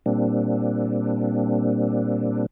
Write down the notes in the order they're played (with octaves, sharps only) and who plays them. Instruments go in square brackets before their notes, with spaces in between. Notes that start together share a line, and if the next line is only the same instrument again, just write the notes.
[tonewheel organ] A#2 G3 A#3 C4 D4